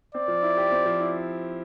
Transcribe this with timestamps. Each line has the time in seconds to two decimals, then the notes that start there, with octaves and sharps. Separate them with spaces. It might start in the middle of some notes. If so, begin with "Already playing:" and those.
0.15 C4 D5
0.28 F3
0.42 E4
0.57 G4
0.72 C4
0.86 F3
1.00 E4